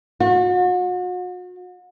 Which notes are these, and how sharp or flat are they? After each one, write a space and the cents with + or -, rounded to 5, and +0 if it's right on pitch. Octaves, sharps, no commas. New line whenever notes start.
F#4 -40